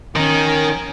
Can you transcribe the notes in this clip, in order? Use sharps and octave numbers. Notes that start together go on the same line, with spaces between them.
D#3 C#4